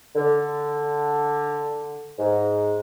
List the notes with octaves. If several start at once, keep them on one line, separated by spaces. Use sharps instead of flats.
D3
G#2